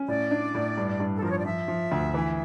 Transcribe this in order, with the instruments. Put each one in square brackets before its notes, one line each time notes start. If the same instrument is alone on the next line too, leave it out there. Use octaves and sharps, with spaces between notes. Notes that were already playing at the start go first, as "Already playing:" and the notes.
Already playing: [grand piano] C#4
[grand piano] A2 [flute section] D5
[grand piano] D4
A2
G2
G2
[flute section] A4
[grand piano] F3 [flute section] A#4
[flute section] C#5
D5
[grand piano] F3 [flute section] E5
[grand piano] F3
D2
E3